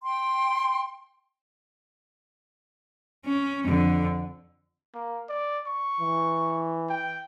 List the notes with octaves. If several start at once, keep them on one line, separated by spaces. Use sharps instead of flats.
G5 C6
C#4
F2 D3
A#3
D5
C#6
E3
G5